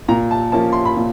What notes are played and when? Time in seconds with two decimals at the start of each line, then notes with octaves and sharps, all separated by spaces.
0.08 A#2 A#5
0.31 A5
0.52 F3 A#3 C#4 A5
0.72 C6
0.86 B5
0.97 A#2